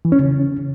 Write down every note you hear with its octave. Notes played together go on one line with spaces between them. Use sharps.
E3
C#4
C#3